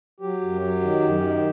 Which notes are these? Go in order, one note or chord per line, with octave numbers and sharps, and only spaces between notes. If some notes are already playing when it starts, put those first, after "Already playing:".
F#3 G4
F#2
F#3
D#3
F#2
D#3